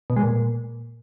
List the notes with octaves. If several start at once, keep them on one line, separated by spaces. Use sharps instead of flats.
B2
G#3
A#2